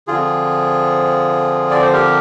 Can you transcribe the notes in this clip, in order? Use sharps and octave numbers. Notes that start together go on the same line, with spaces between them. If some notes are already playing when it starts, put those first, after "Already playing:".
D3 F3 C4 F4 G#4
D5
C5
G4 A#4